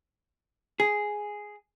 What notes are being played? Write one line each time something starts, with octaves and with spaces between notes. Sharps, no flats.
G#4